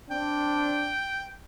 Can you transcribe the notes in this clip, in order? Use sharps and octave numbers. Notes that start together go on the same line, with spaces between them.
C4 D4 G5